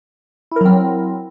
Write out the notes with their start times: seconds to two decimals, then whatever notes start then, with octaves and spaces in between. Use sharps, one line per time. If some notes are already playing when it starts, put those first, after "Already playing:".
0.52 E4
0.56 A#4
0.61 F#3
0.65 C4